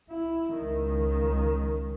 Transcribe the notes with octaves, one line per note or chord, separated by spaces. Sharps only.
E4
C#2 D#3